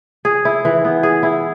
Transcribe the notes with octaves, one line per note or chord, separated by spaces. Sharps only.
G#4
E4
E3
B3
G#4
E4